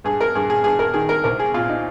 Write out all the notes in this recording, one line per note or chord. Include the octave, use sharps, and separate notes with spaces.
G2 G#4
A#4
G2 G#4
G#4
G2 G#4
A#4
D#3 G#4
A#4
C2 A#4
G#4
A#2 F4
D#4